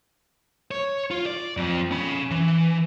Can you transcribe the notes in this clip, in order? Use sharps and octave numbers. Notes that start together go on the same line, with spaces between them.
C#5
F4
D5
F2 F3
C#4 B5
E3